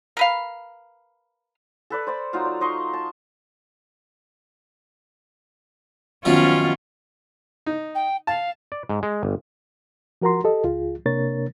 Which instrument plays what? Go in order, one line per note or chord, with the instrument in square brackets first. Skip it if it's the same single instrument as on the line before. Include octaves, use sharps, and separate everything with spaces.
[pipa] A#4 B4 F5
[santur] A4 B4 D5
C5 D5 B5
F#3 D#4 F4 F5
D5
D#4 D#5 C6 C#6
A5
[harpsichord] F#2 D#3 F3 [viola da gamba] B3 C#4 F4
[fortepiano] D#4
[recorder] G5
[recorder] F5 [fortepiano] A5
[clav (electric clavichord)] D5
G#2
G#3
G1
[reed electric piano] F3 F#4 A#4 F#5 A#5 C6
G4 A4 D#5
C#2 F4 G#4
C3 A#3 D4 A#4 C#5 A6